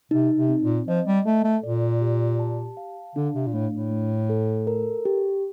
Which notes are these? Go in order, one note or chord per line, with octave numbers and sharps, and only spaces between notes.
C3 D#4
C3
C4
A#2
F3 D#5
G3
A3 A4
A3
A#2 D5
G4
A5
F5
D3 D4
C3
A#2
A2 A3
A2
A3
A4
A#4
G4